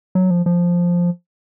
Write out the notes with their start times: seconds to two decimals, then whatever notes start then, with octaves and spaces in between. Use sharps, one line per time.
0.15 F#3
0.31 F3
0.46 F3